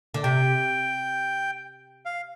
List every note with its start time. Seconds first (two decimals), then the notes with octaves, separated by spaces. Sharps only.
0.14 D3
0.24 C3 G5
2.06 F5